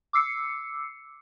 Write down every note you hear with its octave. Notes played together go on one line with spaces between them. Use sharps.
D6 E6 C7 C#7